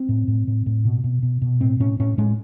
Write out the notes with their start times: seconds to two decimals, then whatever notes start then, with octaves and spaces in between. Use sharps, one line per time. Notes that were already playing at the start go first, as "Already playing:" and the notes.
Already playing: C4
0.09 A2
0.28 A2
0.47 A2
0.66 A2
0.85 B2
1.04 B2
1.22 B2
1.42 B2
1.61 A2 C4
1.80 A2 C#4
2.00 A2 C#4
2.18 A2 G#3